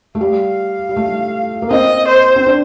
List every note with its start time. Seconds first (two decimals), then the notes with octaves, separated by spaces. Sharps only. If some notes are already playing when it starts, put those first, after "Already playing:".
0.15 A3
0.21 G3 F5
0.89 G3
0.96 A3
1.62 A#3
1.70 C4 D#5
2.08 C5
2.36 C4
2.46 D4